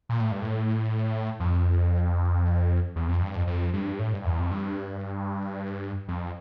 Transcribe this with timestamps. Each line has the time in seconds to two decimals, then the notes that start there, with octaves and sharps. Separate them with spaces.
0.09 A#2
0.21 A2
0.32 G2
0.42 A2
1.40 F2
2.96 E2
3.08 F2
3.22 G2
3.35 F2
3.47 F2
3.73 G2
3.99 A2
4.13 G2
4.25 E2
4.39 F2
4.52 G2
6.08 F2